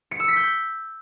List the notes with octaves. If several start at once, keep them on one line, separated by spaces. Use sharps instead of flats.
C#7
E6
B6
G6